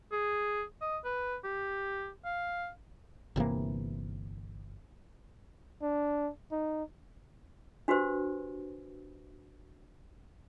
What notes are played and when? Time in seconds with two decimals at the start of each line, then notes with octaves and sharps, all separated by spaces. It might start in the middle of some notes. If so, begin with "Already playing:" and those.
0.12 G#4
0.81 D#5
1.05 B4
1.44 G4
2.25 F5
3.36 G1 C3 E3 A#3
5.82 D4
6.51 D#4
7.88 D4 F#4 G4 B4 C5